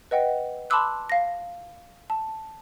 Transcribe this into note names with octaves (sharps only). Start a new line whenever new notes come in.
B4 D#5 F#5 G5
A5 B5 C6 D6 E6 F#6
F5 A#6
A5